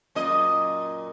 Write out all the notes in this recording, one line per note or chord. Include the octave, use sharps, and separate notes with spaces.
F#2 A#2 D#5